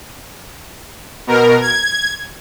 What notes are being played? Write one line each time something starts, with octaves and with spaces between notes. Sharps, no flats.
B2 A#4
G#6